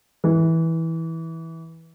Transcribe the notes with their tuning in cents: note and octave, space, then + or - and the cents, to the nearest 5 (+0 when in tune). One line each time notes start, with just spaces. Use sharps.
E3 -15